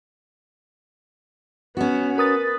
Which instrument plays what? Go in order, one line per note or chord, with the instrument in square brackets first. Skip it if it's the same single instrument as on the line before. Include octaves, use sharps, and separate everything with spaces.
[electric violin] B3 [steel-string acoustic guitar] C#4 F#4
[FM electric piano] A#4 D#6 A6 [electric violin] B4